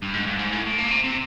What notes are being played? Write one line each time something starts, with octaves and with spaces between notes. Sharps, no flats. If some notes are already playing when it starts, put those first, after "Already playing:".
G2
G#2
G2
G#2
A2
A2
A#2
C3
C3